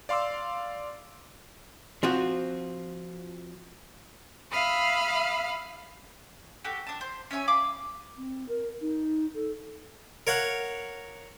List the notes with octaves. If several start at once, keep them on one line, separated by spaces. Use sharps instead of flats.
D5 F5 C6 D6 E6
F3 C4 F4 F#4
E5 F5 B5 D#6 F6
F#4 G4 A4
D4 A5
C5
C#4 C#5 E5 G#5
F5 B5 D6
C4
A#4
D#4
A4
A#4 C#5 F5 F#5